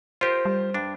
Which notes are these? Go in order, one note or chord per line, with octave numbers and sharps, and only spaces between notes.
F4 G4 A#4 C5
G3
G2 D4